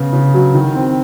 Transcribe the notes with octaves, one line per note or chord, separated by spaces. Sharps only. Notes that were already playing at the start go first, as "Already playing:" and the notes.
Already playing: C#3 B3
C#3
F#3
D#3
C4